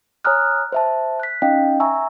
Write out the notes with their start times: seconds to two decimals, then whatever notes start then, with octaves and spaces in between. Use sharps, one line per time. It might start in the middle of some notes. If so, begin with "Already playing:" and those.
0.25 C#5 G#5 A#5 D#6 F6 F#6
0.72 C5 E5 A5
1.20 F#6 B6
1.42 C#4 D#4 D#5 F5 G5
1.80 E5 G#5 A#5 C#6 E6